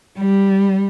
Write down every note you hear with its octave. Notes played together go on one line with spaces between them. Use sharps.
G3